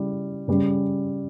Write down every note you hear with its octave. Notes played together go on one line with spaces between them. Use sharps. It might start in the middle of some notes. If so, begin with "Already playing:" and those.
Already playing: C#3 G3 E4
C#3 G3 C#4